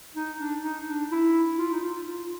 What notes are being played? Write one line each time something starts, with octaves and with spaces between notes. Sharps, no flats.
D#4
D4
D#4
D4
E4
F4
D#4
F4
F4